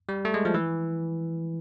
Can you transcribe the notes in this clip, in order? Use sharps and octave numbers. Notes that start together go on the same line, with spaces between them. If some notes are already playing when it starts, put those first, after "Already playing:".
G3
A3
G#3
F3
E3